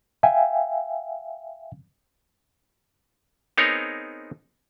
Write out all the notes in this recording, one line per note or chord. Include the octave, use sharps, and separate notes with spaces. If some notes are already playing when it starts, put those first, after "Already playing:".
E5 F5 G5 G#5
B3 C4 D#4 G#4 A#4 C#5